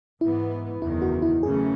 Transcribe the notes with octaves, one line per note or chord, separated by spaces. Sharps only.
G#2 E3 B3 E4
F#1 E2 D#3 E4
F#4
E4
F#2 C#3 E3 A3 C#4 G#4